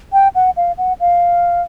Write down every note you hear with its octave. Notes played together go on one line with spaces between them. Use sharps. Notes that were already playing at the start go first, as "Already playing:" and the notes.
G5
F#5
F5
F#5
F5